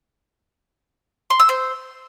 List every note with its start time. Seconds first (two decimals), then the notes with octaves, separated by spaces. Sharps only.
1.30 C6
1.40 E6
1.49 C5